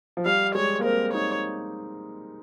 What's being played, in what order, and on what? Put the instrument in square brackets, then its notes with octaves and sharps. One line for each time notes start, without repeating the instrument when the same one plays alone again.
[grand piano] F3
[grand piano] G3 [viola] F5
[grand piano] G#3 [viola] C#5
[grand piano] A#3
[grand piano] C4 [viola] A#4
[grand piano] D#4 [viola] C#5